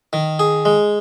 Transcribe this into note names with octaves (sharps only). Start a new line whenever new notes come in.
D#3
G#4
G#3